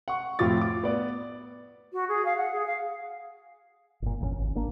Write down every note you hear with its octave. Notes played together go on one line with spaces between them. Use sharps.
F#5 C#6
F2 A2 F4 D6 A6
D6
B3 D5
F#4
G#4
F5
F#5
G#4
F5
G1 A#2
G1 E2 C#3 C#4
G#1
G#1 A#3 D4